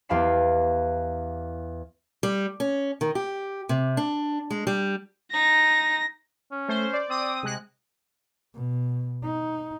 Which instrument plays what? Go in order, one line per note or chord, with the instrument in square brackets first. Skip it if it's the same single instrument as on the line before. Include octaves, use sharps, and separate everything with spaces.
[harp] E2 G4 F5 A5 B5 C7
[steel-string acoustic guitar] G3
C#4
D#3
G4
C3
D4
G#3
G3
[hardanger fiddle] D#4 [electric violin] A#6
[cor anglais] C#4
[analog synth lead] A3 [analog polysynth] C5
[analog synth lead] D5
[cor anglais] C4 [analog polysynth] D#6
[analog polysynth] C3 G#3 F#6
[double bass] B2
D#4